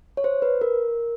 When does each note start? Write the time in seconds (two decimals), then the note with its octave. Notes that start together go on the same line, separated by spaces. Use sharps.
0.17 C#5
0.24 C5
0.42 B4
0.61 A#4